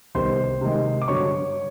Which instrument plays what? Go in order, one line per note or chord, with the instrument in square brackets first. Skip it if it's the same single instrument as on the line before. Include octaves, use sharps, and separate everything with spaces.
[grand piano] C2 C3 D#3 G3 B3 C5 C6
C3 D#3 G#3
D6
G2 D3 F#3 C#5 C#6